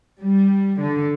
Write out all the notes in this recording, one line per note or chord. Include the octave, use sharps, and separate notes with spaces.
G3
D3